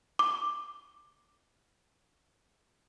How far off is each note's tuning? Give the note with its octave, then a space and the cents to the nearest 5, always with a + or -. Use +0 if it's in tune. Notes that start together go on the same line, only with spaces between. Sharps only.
D6 +10